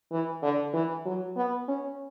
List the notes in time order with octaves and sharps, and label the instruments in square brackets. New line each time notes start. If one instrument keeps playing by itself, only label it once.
[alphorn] E3
D3
E3
F#3
B3
C#4